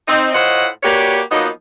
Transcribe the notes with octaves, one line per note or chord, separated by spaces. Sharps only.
C4 D#4
A2 F4 C5 C#5 D#5 F#5
A#3 F#4 G4 B4 C#5 D5
F3 F#3 A#3 B3 D#4